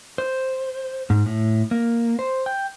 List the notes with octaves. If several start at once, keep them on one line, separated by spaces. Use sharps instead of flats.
C5
G#2
A2
A#3
C5
G5